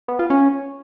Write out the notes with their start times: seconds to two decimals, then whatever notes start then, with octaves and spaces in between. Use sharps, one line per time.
0.08 B3
0.19 F4
0.30 C#4